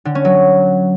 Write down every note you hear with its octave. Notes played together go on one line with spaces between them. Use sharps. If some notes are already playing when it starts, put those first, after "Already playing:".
D3
C#4
F#3